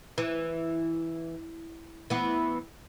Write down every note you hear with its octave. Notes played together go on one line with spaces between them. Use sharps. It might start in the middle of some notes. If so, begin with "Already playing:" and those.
E3
E3 B3